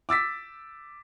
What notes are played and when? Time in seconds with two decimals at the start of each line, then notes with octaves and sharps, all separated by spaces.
0.09 D6 E6 A6 B6